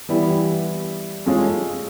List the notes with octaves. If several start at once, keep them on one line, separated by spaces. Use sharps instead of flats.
E3 G3 B3 E4 G4
G#3 C#4 F4 A4